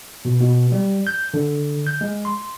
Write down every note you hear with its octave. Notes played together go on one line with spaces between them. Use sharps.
B2
B2
G3
G6
D3
G6
G#3
C6